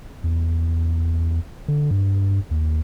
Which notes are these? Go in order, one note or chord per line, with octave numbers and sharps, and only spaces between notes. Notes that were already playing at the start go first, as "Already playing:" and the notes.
E2
D3
G2
D#2